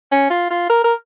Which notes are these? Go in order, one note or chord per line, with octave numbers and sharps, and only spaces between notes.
C#4
F4
F4
A#4
A#4